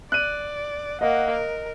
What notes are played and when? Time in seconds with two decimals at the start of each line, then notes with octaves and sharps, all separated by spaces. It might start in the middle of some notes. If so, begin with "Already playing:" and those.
0.12 D5 F#6 D#7
1.01 A#3 D#5 F#5
1.32 A#4